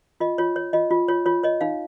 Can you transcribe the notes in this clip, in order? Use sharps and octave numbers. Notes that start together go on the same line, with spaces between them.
F4 D#5
F4 C#5
C#5
F4 D#5
F4
F4 C#5
F4 C#5
C#5 D#5
D#4 F5